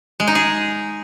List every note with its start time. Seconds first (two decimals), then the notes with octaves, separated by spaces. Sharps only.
0.20 G#3
0.27 D#4
0.35 G#4